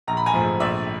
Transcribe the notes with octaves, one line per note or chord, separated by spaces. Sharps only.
A#1 A#5
B5
G#5 A#5
G#2 F3 A3 C4
A#1 D5 E5